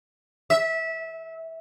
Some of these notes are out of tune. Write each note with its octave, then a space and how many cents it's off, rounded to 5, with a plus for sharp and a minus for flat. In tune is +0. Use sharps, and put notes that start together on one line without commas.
E5 -20